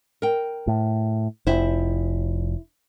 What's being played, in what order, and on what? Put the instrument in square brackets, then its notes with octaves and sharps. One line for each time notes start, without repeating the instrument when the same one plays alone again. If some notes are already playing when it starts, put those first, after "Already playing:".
[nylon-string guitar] A#4 G5
[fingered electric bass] A2
[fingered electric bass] F1 [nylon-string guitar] E4 C5